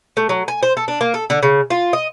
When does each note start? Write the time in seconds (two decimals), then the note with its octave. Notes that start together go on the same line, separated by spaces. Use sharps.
0.17 A3
0.29 F#3
0.48 G#5
0.63 C5
0.77 A4
0.88 D4
1.01 A#3
1.14 A4
1.30 D3
1.43 C#3
1.70 F4
1.93 D#5